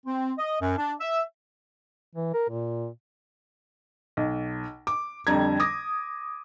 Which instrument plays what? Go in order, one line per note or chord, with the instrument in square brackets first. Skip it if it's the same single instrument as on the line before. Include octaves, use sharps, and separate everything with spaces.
[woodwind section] C4
D#5
F#2
D4
E5
[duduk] E3
A#4
A#2
[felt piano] B1
D6
F2 D3 G3 A#5 G#6
D6 D#6 A#6